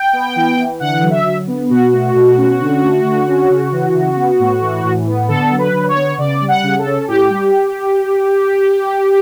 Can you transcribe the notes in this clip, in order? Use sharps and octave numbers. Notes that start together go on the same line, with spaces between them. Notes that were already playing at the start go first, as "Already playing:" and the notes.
Already playing: G5
B3
E3
E3
D3 F#5
F#3
E5
D3
B3
B2 F#4
A3
B2
C#4
D3
A3
D3
C#4
C#3
E3
C#3
B3
A2
E3
A2
B3
D3 A4
F#3
B4
D3
C#5
B3
C#3 D5
G3
F#5
C#3
A4
C#4
A2 G4
G3